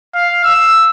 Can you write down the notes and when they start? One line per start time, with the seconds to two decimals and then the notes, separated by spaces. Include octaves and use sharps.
0.15 F5
0.44 E6